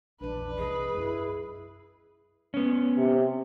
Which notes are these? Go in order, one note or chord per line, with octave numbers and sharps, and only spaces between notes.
A#1 E2 D4 B4
C2 E3 G#4 D#5
F#2 E4 F4
B3 C#4
C3